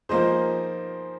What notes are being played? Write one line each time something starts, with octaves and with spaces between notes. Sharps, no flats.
F3 A#3 D#4 G#4 C5